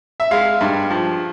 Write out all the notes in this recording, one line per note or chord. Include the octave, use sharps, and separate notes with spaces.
E5
G#3 F5
G2
F3